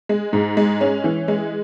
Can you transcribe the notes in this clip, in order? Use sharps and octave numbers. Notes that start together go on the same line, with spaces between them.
G#3
G#2
G#3
C#4
E3
G#3